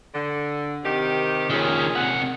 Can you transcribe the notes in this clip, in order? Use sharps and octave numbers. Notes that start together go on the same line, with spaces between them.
D3
C3 D#3 G4
A#2 D#3 C#4 G#4
C3 F#5